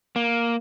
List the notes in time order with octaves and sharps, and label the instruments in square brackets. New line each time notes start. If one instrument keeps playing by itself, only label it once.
[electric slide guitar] A#3